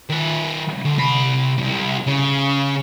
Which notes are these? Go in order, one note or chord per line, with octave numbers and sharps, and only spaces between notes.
D#3 E5
D2
C3 B5
C2 F2
C#3